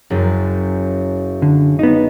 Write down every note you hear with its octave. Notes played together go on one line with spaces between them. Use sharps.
F#1 F#2
D3
B3 D#4